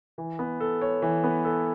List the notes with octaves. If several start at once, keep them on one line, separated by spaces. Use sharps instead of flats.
E3
B3
A4
C#5
E3
B3
A4